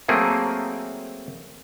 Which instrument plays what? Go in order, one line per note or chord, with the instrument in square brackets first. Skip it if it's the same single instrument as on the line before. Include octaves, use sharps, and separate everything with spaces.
[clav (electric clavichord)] F#3 A3 A#3 C4 G#4